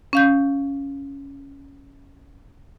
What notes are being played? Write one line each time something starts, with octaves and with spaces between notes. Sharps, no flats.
C#4 F5 G6